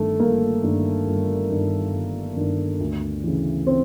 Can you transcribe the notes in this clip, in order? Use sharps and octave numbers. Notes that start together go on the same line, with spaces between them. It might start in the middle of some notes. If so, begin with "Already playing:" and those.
Already playing: G1 G2 D#3 A3
G1 A#3
G2 D#3
G1
G2 D#3
G1
G2 D#3
D2
C#3 E3
C4